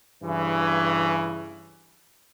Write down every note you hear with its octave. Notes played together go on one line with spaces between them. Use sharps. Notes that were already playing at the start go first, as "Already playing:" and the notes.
G2 C#3 E3